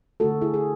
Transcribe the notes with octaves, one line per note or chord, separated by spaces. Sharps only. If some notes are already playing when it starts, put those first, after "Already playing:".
D3 A3 F#4 A4
E4 G#4
G#4